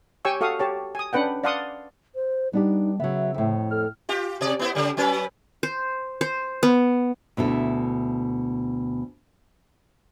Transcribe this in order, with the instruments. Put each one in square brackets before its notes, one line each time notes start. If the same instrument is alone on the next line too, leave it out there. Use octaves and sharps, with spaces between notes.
[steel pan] G4 C#5 G5 G#5 C#6 E6
F#4 A4 F5 C#6 D#6
G4 C#5 A5
G#5 D#6
C#4 D4 B4 F#5 G5
D5 F5 F#5 A5 C6 D#6
[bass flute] C5
[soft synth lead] G3 [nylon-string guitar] B3 D4 G4 [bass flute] D#4
[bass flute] C#3 [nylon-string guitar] F#3 B3 [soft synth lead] E5
[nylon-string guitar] F2 A2
[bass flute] A4 [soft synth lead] F6
[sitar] F4 G4
C3 D5
B3 E4 C5
C#3 G3
F#3 C#4 B4
[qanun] C5
C5
B3
[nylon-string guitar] D2 B2 E4 A4